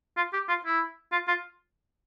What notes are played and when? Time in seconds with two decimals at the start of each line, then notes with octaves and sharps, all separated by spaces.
0.17 F4
0.33 G4
0.48 F4
0.65 E4
1.12 F4
1.28 F4